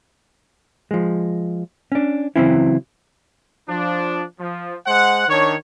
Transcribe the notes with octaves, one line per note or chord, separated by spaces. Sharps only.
F3 G#3
C#4 D4
C#3 E3 F#3 C4 C#4 E4
F3 D4
F3
G#3 C5 F#5
D#3 D4 C#5